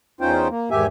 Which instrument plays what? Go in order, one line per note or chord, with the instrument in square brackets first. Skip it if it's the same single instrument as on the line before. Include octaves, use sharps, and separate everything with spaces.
[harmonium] E2 C#4 D#4 F4 C5 G5
A#3
E2 G#2 D#3 G4 E5 G#5